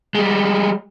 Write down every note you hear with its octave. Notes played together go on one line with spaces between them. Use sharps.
G3 G#3